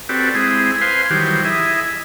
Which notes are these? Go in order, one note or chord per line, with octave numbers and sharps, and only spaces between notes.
C4 F#4 G4 A4 B4 D5
G#3 C4 E4 G#4
B4 C5 F5 G#5 C6
D#3 E3 F#3 G3 G4 C5
E4 G#4 D#5 E5